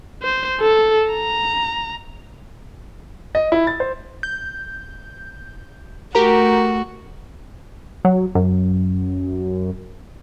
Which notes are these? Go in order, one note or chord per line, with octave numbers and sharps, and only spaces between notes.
C5
A4
A#5
D#5
E4
A6
C5
G6
A3 F#4 G4 A#4 A#5
F#3
F#2